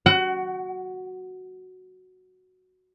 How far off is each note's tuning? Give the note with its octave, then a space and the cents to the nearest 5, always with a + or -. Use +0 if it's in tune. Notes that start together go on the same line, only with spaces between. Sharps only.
F#4 +0 F#5 +25